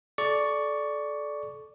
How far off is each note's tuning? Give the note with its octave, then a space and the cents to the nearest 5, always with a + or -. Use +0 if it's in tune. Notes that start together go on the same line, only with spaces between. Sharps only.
A4 -25 D5 +0 C#6 +10